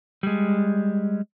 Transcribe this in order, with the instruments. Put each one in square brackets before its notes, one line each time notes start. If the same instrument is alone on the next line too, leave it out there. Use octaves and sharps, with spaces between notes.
[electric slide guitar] G3 G#3